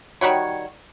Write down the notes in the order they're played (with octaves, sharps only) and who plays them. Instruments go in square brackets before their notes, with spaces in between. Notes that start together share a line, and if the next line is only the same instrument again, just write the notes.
[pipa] D#3 G3 F#4 C#5